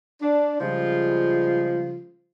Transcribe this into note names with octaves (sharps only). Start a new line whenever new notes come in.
D4
C#3 F3 G3 G#3 F4